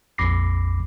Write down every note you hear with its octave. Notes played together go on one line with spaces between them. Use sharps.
A#1 F2 B5 D6 A#6 C7